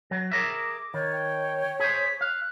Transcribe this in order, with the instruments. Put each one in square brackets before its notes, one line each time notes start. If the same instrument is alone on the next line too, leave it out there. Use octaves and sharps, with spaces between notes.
[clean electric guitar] F#3 [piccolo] A#6
[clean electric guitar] G#4 A#4 E5 [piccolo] D6
[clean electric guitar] D#3 [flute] C#5
[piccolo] G5
[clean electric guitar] G#4 C5 [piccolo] B6
[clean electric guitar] F5 [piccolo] F#6